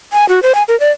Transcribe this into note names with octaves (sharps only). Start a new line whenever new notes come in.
G#5
F#4
C5
G#5
A#4
D5